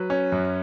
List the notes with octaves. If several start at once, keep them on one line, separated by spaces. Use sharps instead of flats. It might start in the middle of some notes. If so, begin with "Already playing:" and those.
Already playing: F#3 B4
C#4
F#2